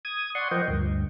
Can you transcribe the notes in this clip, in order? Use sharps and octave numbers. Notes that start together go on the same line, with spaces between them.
D#6 G#6
D5 F#5 C6 C#6
F3 A#4 C5 D#5 G5
D2 G2